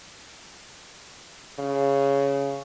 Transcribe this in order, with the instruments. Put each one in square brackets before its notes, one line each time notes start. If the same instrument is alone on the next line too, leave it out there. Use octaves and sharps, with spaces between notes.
[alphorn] C#3